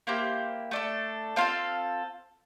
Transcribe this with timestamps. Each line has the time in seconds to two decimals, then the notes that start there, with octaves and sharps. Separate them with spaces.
0.07 A#3 E4 G4 C5
0.71 A3 D4 A4
1.36 C4 F4 A4 F5